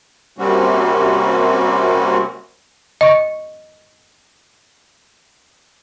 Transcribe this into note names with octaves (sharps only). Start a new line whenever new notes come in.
C3 G3 A#3 C4 C#4 F#4
D#5 C#6